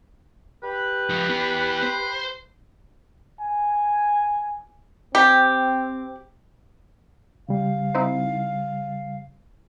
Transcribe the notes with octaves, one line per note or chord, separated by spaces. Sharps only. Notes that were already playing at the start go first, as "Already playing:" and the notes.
G4 B4
F3 D#4
B3 E4
C5
G#5
C4 G4
C#3 G3 F5
C4 D#4 E4